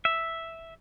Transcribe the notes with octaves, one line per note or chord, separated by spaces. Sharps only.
E5